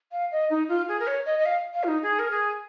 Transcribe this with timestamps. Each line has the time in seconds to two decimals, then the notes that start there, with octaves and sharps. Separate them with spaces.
0.11 F5
0.31 D#5
0.50 D#4
0.68 F4
0.88 G#4
0.99 A#4
1.07 C#5
1.25 D#5
1.38 D#5
1.45 F5
1.73 F5
1.83 F4
1.87 D#4
2.02 G#4
2.19 A#4
2.30 G#4